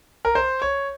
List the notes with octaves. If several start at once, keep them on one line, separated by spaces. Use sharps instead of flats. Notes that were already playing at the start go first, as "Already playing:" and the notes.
A#4
C5
C#5